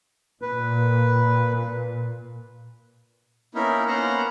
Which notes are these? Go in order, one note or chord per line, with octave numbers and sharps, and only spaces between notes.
A#2 B4
A#3 B3 C#4 D#4 E4 A#4
A#3 B3 C#4 C5 F#5 A#5